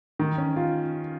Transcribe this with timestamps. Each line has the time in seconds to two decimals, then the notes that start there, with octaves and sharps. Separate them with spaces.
0.19 D#3
0.38 C#4
0.56 F4